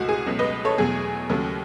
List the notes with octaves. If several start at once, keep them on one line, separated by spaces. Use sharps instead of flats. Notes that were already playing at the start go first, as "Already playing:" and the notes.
Already playing: C#2 C#3 E3 A3 F#4
G#4
C#2 B2 F#3 A3
B4 D#5
A4 C#5
E2 B2 F#3 A3 G#4
D#2 C#3 F#3 A3